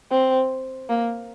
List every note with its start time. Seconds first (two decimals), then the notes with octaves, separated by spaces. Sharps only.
0.11 C4
0.89 A#3